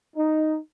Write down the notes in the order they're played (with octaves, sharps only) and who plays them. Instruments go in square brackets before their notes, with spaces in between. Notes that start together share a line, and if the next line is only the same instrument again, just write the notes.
[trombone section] D#4